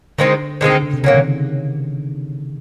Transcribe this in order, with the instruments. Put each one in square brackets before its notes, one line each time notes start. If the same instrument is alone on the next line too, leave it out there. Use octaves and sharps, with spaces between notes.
[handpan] D3 [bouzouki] D#3 G#3 C4 D#4
[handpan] D3 [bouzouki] D#3 G#3 C4 D#4
[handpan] D3
C#3
C3
[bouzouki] A#2 F#3 A#3 [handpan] C#3
[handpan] D#3